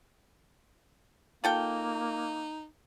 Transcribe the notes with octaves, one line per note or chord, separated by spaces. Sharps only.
A#3 D#4 F4 A4 G5